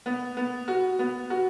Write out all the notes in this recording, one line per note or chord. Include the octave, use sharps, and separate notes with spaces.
B3
B3
F#4
B3
F#4